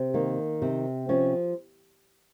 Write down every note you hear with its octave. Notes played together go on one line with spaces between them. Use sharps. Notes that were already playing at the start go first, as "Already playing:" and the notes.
Already playing: C3
D#3 A#3
C3 C4
F3 C#4